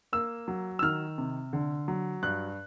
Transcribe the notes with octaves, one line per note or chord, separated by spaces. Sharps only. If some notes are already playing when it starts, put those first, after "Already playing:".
A#3 E6
F#3
E6
D#3 F6
C3
D3
F#3
G2 F#6